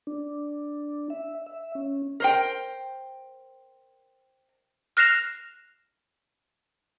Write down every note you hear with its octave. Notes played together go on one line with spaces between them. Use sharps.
D4
E5
E5
C#4
A#4 C5 G5
F6 F#6 A#6 C7 E7 F7